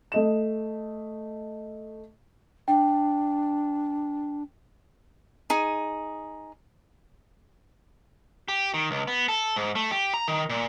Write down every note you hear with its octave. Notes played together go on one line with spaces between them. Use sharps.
A3 D#5 E7
D4 G5
D#4 G#4
G4
D#3
C#2
B3
A4
G#2
A3
G4
A#5
D#3
A#2